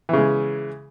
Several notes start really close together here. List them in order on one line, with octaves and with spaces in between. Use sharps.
E3 C#3 G#3